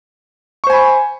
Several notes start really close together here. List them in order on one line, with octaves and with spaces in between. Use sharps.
C#6 C5 G#5 B5